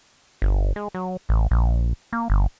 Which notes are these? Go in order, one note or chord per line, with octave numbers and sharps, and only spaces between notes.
G1
G#3
F#3
A1
A#1
A#3
G1